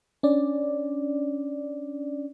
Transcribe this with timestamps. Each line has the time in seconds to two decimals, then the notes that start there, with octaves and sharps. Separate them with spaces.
0.23 C#4 D4 D5